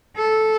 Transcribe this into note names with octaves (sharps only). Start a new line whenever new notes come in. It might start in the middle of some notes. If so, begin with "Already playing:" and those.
A4